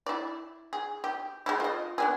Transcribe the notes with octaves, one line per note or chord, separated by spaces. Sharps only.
E4 D5
G#4
G4
G#3 A3 E4
F4 D#5
B3 D4 G#4